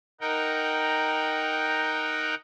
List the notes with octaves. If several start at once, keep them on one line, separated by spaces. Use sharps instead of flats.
D#4 A#4 F#5 G5